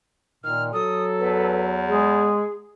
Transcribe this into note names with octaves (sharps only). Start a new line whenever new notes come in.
A#2 D#3 F6
F#3 A4 D#6
E2 B4
G#3 G#4